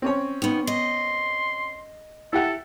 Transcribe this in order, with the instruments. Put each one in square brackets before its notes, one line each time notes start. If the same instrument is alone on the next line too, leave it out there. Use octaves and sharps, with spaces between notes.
[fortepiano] C4 C#4 C#5
[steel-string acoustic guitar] D#3 B3
[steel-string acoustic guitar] D#5 [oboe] C6
[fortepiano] E4 G4 F#5 [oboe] A4